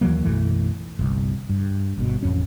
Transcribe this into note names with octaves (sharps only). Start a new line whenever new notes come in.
D#2 E3 F#3 A#3
B1 F#2 E3 A3
G1 C2
G2
G1 B2
A1 F2 C#4